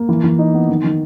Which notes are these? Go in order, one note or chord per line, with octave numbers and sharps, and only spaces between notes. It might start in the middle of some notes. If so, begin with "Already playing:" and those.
Already playing: A#3
E3
E3
D#4
B3
D#3
D#3